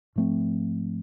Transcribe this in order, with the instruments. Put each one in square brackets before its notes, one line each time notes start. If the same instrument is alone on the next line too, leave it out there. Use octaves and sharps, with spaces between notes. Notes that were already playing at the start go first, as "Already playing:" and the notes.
[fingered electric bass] G#2 F3 A3 C4